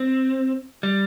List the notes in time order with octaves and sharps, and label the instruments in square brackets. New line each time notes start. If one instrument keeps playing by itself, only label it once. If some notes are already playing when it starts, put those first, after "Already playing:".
Already playing: [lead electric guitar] C4
G3